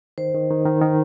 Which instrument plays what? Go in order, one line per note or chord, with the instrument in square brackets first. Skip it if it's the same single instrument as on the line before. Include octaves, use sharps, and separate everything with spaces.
[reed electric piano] D#3 [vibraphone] C5
[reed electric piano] D#3
D#3
D#3
D#3